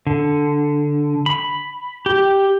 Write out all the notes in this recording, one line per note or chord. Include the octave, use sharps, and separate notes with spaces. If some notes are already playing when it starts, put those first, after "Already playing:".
D3
B5
G4